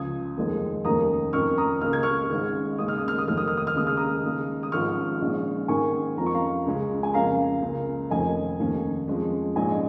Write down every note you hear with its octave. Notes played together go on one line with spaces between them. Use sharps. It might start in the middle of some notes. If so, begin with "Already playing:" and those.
Already playing: C#2 C#3 F3 D#6 G#6
F1 D#2 D#3 G#3
F1 D#2 D#3 A#3 C#4 A#5 D#6
F2 D#3 C#4 C#6 F6
A#5 D#6
C#2 C#3 A#3 C#4 F6
G#6
C#6 F6
G#1 G#2 G#3 C#4
D#2 C#3 G#3 D#6
F6
D#6
F6
D#6
F1 D#2 D#3 F6
D#6
F6
D#6
F6
D#2 C#3 G#3 D#6
F6
A#5 D#6
D#2 C#3 G#3
D#6
G#1 G#2 F3 C#4 C#6 F6
A#1 G#2 G#3 C#4
G#2 D#3 A#3 C#4 G#5 C#6
F2 F3 A#3 C#4 A#5
C#6
F5 A#5
C#2 C#3 G#3 C#4
G#5
F2 C#3 A#3 C#4 F5 A#5
C#2 C#3 A#3
F1 F2 D#3 C#4 D#5 G#5
F1 D#2 D#3 A#3 C#4
F2 F3 G#3 C#4
A#1 G#2 G#3 C#4 D#5 G#5